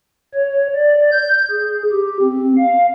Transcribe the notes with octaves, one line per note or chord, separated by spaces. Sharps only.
C#5
D5
G6
G#4
G4
C4
F5